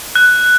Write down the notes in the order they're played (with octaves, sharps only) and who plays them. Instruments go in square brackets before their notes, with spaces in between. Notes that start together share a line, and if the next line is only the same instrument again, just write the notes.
[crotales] F#6